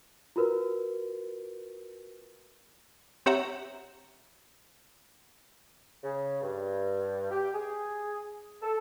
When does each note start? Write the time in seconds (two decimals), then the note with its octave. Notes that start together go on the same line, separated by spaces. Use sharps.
0.36 F4 F#4 A#4 B4
3.26 C4 G4 C#5 E5 F#5 A#5
6.03 C#3
6.42 G2
7.31 G4
7.54 G#4
8.62 A4